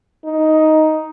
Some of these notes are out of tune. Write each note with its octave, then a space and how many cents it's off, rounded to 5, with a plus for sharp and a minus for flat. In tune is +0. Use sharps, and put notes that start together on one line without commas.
D#4 +5